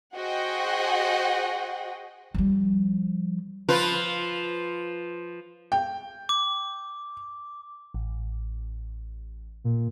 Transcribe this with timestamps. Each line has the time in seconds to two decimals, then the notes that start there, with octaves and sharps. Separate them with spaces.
0.14 F#4 G#4 C5 D#5 F#5 G5
2.34 F3 G3
3.69 F3 F4 B4
5.72 G5
6.29 D6
7.94 A1
9.64 A#2